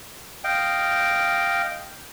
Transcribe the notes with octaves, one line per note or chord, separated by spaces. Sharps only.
D#5 F5 G5